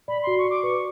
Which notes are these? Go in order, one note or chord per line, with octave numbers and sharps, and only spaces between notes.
D5 B5
F#4 C6
C#6
F#4 D6
B4 C#6